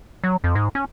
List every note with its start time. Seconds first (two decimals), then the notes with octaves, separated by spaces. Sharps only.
0.24 F#3
0.44 F2
0.55 G#2
0.75 C#4